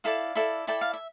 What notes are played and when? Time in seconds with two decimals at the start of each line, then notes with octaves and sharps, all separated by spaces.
0.04 E4 A4 D5 F5
0.35 E4 A4 D5
0.67 E4 A4 D5 G5
0.81 F5
0.93 E5